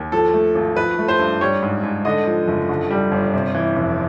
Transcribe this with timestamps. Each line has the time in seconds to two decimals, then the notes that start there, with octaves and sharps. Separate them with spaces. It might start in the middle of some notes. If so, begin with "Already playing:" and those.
Already playing: D#2
0.12 F3 A4
0.34 A3
0.55 G#1
0.76 F3 B4
0.98 A3
1.08 C5
1.19 G2
1.41 G3 C#5
1.62 G#2
1.83 G#2
2.05 D3 D#5
2.27 F3
2.48 F#1
2.69 D3
2.90 G3
3.12 G1
3.34 C3
3.54 E3
3.76 F1